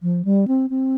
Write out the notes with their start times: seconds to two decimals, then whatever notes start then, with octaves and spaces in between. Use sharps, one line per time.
0.02 F3
0.25 G3
0.48 C4
0.70 C4